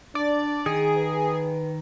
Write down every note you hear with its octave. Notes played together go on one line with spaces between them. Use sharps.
D4 D5
D#3 G#4
B4